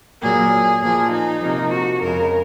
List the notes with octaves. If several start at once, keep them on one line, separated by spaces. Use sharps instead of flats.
A#2 F#3 A#3 G#4
A#2 F3 A#3 G#4
D#4
C3 F3 A#3
F#4
F2 C#3 G#3 A#4